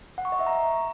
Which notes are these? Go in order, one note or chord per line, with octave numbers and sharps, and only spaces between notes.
F#5
C#6
D#5
E5
A#5